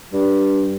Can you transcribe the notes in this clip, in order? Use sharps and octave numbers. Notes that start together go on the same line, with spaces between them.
G2